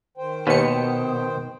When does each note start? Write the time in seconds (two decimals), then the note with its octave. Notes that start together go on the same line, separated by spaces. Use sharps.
0.18 D#3 C5 G5
0.47 D#2 B2 B4 C#7